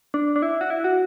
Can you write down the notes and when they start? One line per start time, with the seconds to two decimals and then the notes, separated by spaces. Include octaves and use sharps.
0.14 D4
0.36 D4
0.42 E4
0.61 F#4
0.70 E4
0.84 F#4